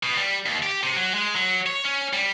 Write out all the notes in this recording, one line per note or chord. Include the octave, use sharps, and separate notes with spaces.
B2
G3
D#2
G4
C3
F#3
G#3
F#3
C#5
C#4
G3